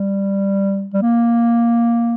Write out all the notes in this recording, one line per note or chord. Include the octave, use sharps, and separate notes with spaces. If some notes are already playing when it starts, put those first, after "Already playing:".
Already playing: G3
G3
A#3